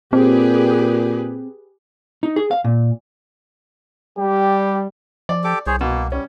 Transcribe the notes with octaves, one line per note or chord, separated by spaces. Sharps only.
A#2 C4 G4 G#4 B4
D#4
G#4
F5
A#2
G3 G4
F3 D5
G4 A4 D6
C2 G#4 C5 C#5
B2 A#3
G3 C#4